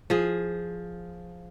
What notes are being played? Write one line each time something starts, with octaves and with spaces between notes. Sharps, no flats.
F3 G#4